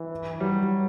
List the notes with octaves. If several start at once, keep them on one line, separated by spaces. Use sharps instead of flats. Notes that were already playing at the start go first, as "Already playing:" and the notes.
Already playing: E3
F#3 G3